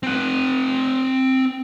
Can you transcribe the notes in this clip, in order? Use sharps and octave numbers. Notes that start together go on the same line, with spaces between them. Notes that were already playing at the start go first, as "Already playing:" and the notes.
C4 F#5